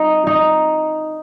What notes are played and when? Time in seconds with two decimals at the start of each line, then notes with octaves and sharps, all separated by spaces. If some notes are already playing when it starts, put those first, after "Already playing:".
Already playing: D#4
0.27 D#4